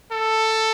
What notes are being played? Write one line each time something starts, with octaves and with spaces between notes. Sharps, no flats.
A4